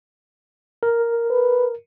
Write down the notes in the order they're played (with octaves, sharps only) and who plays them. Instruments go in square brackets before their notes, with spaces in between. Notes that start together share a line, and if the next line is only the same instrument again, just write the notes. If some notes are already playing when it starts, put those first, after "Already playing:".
[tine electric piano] A#4
[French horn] B4